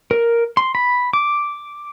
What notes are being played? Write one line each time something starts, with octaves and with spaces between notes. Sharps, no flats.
A#4
C6
B5
D6